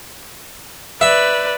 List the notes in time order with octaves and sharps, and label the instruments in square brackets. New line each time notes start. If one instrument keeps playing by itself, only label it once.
[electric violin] B4 D5 [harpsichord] E5